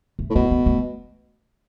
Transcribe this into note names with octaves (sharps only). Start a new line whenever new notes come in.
A3
A2
B2 A3
B3
A3